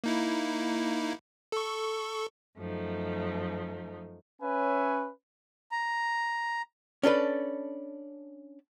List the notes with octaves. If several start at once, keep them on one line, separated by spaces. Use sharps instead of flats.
A#3 D#4 E4
A4 C#6
F#2 F3 A3 D#4
C#4 B4 C#5 E5 G#5
A#5
C#4 D4 A4 B4